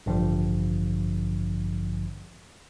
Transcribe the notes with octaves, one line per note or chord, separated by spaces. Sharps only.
A1 G2 D3 F3